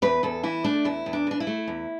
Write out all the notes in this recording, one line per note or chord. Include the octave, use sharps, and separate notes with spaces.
E2 B4
E2 A4
E3 E4
A3 D4
E2 E4
E2
D4
E3 D4
E4
A3
E2